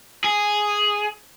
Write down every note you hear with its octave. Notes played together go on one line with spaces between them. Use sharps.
G#4